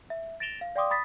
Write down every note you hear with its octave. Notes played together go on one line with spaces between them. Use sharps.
E5
A6 A#6 D7 E7 F7 G7
F5
D5 F5 G5 C6 D6 D#6
B5 D#6 A6 B6